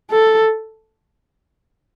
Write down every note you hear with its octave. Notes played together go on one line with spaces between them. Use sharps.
A4